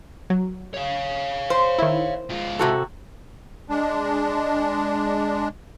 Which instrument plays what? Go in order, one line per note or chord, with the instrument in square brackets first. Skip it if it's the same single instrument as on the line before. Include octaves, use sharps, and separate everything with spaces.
[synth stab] F#3
[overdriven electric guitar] C#5 F5
[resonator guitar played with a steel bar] C5
[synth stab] D#3 E4
[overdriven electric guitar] G#2 F4
[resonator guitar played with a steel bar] C3 F#4 A4
[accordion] G#3 D4